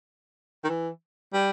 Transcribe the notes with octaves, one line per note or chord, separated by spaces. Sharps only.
D#3
E3
G3